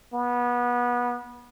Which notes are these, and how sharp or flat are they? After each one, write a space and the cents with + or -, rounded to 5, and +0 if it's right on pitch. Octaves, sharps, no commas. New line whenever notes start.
B3 -25